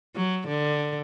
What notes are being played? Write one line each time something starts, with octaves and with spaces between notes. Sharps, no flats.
F#3
D3